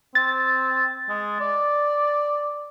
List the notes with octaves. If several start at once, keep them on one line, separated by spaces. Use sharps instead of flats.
C4 A6
G#3
D5